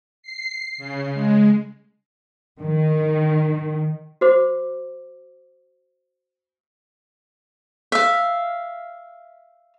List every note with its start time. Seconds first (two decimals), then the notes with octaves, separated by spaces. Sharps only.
0.23 C7
0.78 C#3
1.14 G#3
2.59 D#3
4.21 F#4 C5 D6
7.92 E5 F5